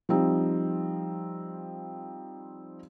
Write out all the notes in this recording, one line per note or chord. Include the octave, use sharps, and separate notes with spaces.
F3 G3 C4 D#4